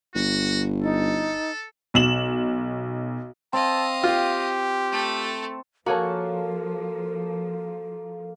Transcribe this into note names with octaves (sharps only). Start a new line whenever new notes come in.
G1 F#4
D#4 A4
B1 E7 F#7
C4 D#5 F5 A5
F4 G4
A3 A4
F3 A#3 F#4 G#4 A4 C#5 A5